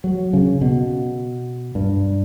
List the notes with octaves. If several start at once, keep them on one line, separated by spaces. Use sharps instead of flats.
F#3
C#3
B2
G2